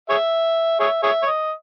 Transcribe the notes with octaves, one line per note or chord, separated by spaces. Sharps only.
G#4 C#5 E5
G#4 C#5 E5
G#4 C#5 E5
C#5
D#5